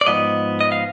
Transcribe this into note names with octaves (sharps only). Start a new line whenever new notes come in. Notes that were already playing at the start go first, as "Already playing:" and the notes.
D5
G#2 F3 B3 D#5
D#5
F5